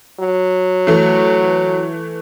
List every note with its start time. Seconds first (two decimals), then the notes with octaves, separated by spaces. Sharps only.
0.20 F#3
0.87 E3 A3